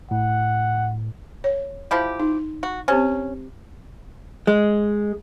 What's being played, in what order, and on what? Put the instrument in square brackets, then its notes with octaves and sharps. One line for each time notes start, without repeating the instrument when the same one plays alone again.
[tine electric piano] A2 [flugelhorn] F#5
[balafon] C#5
[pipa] F3 E4 G4
[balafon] D#4
[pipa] F#4
[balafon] C4 G4 C5 [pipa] C#4
[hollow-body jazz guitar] G#3